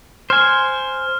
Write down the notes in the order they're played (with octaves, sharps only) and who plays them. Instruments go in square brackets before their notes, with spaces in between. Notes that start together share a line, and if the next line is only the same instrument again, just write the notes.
[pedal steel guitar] C5 G#5 [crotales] F6